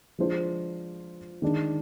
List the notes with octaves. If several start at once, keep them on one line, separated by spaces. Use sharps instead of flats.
F3 G#3 D4 F4 C5
D#3 G#3 D4